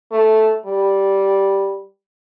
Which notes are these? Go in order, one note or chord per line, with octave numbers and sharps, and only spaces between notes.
A3
G3